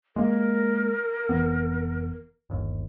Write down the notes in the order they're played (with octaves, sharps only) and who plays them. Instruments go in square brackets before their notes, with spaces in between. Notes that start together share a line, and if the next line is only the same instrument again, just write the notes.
[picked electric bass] G#3 A#3 [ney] A#4
[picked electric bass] F1 E3 B3
G1 D#2